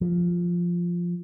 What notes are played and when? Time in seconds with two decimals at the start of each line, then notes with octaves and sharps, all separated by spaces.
0.01 F3